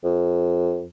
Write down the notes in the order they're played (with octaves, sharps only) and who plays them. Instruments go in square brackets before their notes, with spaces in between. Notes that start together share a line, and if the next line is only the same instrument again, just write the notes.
[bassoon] F2